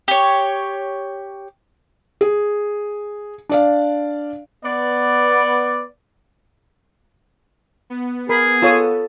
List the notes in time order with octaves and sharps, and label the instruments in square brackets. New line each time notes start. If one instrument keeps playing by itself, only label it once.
[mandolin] G4 C#5
[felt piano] G#4
D4 D5 F5
[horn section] B3 D5
[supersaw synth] B3
[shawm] G#4 [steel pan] A#4 B5
[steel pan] F4 C#5 D#6 [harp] A4